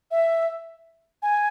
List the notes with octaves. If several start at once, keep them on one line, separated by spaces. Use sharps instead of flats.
E5
G#5